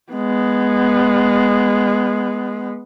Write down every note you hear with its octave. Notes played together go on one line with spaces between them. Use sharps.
G#3 B3